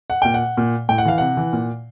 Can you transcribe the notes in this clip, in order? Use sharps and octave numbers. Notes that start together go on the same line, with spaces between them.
F#5
A#2 G5
F#5
A#2
A2 G5
F#5
E3 F5
C3 F#5
E3
A#2